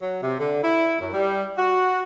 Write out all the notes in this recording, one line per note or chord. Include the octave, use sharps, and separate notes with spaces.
F#3
C3
D3
E4
F#2
G3
F#4